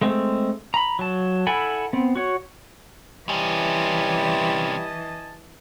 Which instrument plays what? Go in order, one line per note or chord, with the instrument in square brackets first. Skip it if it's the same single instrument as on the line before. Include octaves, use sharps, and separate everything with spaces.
[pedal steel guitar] G#3 A3 C4
A#5 B5
F#3 A5
E4 A4 F#5 G#5 B5
B3 C4
F#4 C#5
[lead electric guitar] C3 C#4 [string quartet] E3 [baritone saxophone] G3 [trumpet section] D#5 G#5 A5